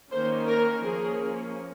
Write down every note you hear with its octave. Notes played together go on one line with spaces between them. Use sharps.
D#3 A#3 C#4 C5
A#4
F3 A#3 C#4 G#4